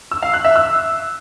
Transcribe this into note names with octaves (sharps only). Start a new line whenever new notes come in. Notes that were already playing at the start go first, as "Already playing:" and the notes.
E6
F5
F#6
E5
E6